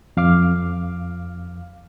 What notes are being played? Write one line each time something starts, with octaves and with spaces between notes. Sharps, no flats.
F2 F5 D6 F6